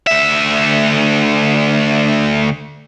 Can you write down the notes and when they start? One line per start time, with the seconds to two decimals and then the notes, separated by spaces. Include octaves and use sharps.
0.07 D2 E5